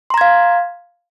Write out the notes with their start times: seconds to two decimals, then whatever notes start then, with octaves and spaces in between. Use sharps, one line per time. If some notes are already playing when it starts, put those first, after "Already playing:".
0.10 C6
0.14 A#5
0.18 G#6
0.21 F5